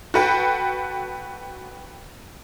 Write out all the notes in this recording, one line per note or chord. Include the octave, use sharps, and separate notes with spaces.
F#4 A4 B4 F#5 G5